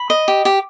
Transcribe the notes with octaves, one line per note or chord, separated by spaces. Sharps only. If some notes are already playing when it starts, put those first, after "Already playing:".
Already playing: B5
D#5
G4
G4